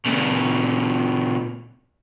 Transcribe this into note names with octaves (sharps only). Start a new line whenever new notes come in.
A#2 C#3